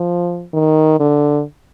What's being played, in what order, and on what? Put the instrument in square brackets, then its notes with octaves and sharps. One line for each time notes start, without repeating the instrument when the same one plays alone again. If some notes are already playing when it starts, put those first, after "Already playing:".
Already playing: [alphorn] F3
D#3
D3